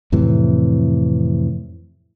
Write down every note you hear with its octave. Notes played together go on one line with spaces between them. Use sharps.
F2 A2 C3 E3